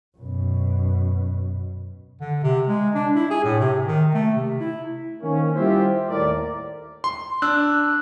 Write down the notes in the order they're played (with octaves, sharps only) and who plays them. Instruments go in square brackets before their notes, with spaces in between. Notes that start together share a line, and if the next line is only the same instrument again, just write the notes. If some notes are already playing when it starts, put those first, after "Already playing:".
[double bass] F#2 B2
[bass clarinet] D3
C3
G#3
D4
E4
G#4
A2
C3
D#3
A3
C3
E4
[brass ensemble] D#3 A#3 C4 C#4
G3 E4 F4 G4 C5 E5
D#2 A2 A#4 D5
[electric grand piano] C6
[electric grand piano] D4 [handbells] E6 F#6